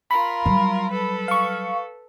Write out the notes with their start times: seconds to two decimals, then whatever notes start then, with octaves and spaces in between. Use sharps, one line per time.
0.11 F4 A#4 B5
0.46 F#3 G3
0.92 A4 B4
1.28 F5 C#6